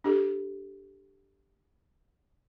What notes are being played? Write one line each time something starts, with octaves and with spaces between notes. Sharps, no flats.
D4 G4 A4